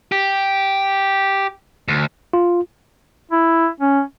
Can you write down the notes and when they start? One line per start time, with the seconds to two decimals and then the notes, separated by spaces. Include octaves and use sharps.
0.12 G4
1.88 D2
2.33 F4
3.31 E4
3.80 C#4